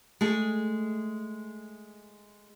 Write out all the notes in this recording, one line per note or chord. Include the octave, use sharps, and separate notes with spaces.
G#3 A3 G#4